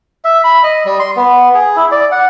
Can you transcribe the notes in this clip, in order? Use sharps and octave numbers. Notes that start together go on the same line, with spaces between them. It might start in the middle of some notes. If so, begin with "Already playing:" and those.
E5
B5
D#5
G3
C6
B3
G#4
E4
D5
F#5